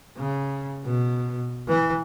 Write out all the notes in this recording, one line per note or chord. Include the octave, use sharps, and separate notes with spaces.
C#3
B2
E3